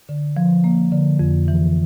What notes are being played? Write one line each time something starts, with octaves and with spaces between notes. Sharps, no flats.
D3
F3
A#3
D3
F2
E3